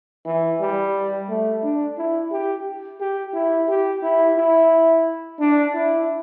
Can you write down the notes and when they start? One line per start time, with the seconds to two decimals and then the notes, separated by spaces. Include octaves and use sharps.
0.26 E3
0.61 G3
1.29 A3
1.63 D4
1.98 E4
2.32 G4
3.01 G4
3.34 E4
3.69 G4
4.03 E4
4.37 E4
5.40 D4
5.74 E4